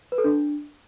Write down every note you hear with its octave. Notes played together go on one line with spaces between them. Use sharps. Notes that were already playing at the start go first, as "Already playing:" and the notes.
B4
A4
D4